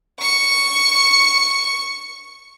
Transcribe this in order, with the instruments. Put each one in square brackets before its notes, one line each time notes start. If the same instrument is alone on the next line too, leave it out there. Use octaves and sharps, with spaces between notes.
[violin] C#6 C#7